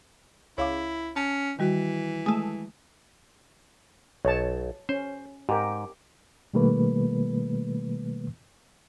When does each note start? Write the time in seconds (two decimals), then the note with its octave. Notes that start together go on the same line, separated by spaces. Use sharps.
0.58 C#2 E4 C#5 F5 D6
1.16 C#4 A5
1.59 D#3 E3 G3 F#4
2.26 G#3 A3
4.25 B1 C#5 A5
4.89 C#4 C5
5.49 G#2 G4 A#4
6.54 B2 D#3 G3 A3 A#3 B4